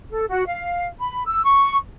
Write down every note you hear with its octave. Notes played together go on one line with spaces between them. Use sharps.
A4
F#4
F5
B5
E6
C#6